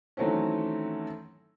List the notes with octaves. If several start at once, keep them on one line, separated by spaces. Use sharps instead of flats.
D#3 E3 F#3 A3 C4 C#4